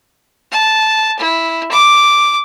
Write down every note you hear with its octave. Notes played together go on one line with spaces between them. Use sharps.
A5
E4
D6